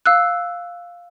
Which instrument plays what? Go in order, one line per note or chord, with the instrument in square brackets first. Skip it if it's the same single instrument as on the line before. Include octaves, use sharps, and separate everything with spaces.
[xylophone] F5 E6 F#6